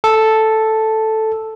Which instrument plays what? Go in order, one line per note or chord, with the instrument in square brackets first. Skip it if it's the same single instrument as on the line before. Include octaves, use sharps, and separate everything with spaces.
[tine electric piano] A4